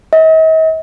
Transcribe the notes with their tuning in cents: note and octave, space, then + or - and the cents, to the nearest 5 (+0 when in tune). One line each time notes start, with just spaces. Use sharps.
D#5 +45